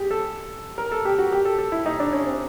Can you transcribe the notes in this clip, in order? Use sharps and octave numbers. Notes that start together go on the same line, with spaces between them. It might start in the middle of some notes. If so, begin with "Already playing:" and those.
Already playing: G4 G#4
A4
A#4
A4
G4
F#4
G4
A4
A4
E4
D#4
D4
C#4
C4